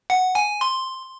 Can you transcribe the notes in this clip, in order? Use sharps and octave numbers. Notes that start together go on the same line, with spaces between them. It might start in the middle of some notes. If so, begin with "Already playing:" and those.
F#5
G#5
C6